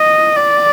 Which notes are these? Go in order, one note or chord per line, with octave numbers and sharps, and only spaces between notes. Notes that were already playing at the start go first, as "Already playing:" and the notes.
Already playing: D#5
D5